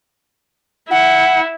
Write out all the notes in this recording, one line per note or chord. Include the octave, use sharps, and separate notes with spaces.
E4 F#5